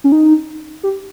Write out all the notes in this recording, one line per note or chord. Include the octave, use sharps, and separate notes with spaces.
C#4
D#4
G4